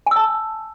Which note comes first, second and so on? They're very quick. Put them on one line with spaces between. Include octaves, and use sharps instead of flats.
G#5 E6 A5